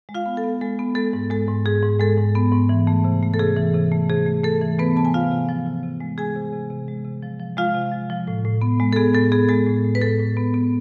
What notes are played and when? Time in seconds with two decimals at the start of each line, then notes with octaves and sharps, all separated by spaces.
0.09 G#3
0.15 F4 F5
0.26 B3
0.37 A4
0.44 B3
0.61 G#3 A4
0.79 B3
0.95 G#3 A4
1.13 G#2
1.30 G#3 A4
1.48 G#2
1.65 G#2 G#4
1.83 G#2
2.00 G#3 A4
2.17 G#2
2.35 B3
2.52 G#2
2.69 E3
2.87 A3
3.04 C3
3.23 A3
3.34 A4
3.39 C3 G#4
3.56 E3
3.74 C3
3.92 A3
4.09 C3 G#4
4.26 A3
4.44 A3 A4
4.62 E3
4.78 A3 B3 B4
4.96 C3 A5
5.05 G#5
5.14 C3 F4 F5
5.31 C3
5.49 F3
5.66 C3
5.83 C3
6.00 G#3
6.18 G#3 G#4 G#5
6.36 C3
6.53 C3
6.70 C3
6.88 G#3
7.05 C3
7.22 F3
7.40 F3
7.57 G#3 F4 F5
7.74 C3
7.92 F3
8.10 F3
8.28 A2
8.45 A2
8.61 B3
8.80 G#3
8.93 A4
8.96 B3 G#4
9.14 A2 A4
9.32 B3 G#4
9.49 G#3 A4
9.67 A2
9.84 A2
9.95 B4
10.01 A2 A4
10.19 A2
10.37 B3
10.54 B3